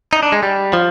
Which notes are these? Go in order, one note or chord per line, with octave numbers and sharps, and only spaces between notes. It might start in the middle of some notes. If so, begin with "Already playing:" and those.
D#4
D4
G#3
G3
F3